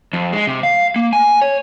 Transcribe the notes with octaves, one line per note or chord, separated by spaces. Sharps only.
F2
G#3
C3
F5
A#3
G#5
C#5